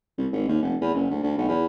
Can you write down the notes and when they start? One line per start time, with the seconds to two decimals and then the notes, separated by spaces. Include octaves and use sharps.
0.18 C2
0.32 G#1
0.48 D#2
0.62 F1
0.81 E2
0.94 F#1
1.10 D2
1.23 D2
1.37 B1
1.48 E2